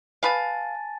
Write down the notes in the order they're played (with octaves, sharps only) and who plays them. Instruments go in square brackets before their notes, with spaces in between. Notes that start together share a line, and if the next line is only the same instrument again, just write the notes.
[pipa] B4 F5 [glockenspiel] G#5 A5 A6